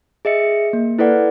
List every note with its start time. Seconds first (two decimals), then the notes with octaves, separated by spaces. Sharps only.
0.25 G#4 D#5 E5 C#7
0.73 A#3
0.99 E4 A4 B4 D5 F#5